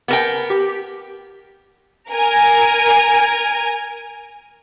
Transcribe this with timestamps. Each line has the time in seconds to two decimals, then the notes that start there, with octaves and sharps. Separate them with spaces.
0.08 B3 A#4 G5
0.50 G4
2.11 A#4 G#5